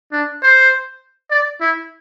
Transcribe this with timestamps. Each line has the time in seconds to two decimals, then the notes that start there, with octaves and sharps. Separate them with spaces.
0.12 D4
0.43 C5
1.31 D5
1.61 E4